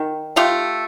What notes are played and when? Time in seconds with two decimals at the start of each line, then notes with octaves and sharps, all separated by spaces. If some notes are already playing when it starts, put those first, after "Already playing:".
Already playing: D#3
0.36 A3 F4 G4